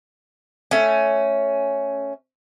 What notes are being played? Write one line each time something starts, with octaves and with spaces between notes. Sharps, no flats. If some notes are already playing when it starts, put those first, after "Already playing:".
A3 C#4